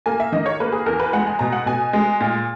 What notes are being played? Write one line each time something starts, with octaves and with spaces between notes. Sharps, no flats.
A#3 G#5
E5
D#3 D#5
C#5
A#3 B4
G#4
E2 A#4
B4
G#3 F#5
G#5
B2 A#5
F#5
B2 G#5
G#3
A#2